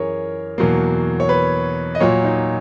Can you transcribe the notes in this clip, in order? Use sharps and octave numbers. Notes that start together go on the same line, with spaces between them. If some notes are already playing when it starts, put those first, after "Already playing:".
Already playing: F#2 E3 G#4 A#4 C#5
E2 B2 F#3 A#3
C#5
B4
D#5
A#2 F#3 A#3 C#5
D#4